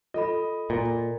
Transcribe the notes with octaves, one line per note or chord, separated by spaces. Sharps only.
F4 A4 D#5 B5
A#2